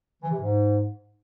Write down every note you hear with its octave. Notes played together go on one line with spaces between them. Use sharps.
E3
C3
G#2